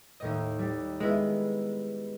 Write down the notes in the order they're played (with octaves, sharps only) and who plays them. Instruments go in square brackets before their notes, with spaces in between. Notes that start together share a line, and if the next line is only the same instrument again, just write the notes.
[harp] D#2 A2 D#5
G3
[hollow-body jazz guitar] G#3 [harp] B3 E4